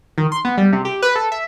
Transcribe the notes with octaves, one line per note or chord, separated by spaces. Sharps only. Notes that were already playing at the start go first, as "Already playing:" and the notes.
D#3
C6
B3
G3
C3
G4
B4
A4
E5